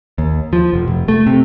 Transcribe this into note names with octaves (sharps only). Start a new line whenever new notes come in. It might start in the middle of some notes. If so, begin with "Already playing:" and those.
D#2
F3
F1
F1
A3
C3